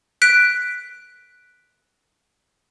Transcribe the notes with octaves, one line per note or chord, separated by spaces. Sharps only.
F#6 B6 D7